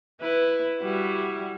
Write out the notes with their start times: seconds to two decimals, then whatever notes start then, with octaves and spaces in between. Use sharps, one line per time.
0.21 E4 B4
0.81 G3 E4 F#4